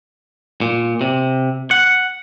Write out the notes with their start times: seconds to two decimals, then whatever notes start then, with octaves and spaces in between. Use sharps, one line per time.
0.61 A#2
1.01 C3
1.71 F#5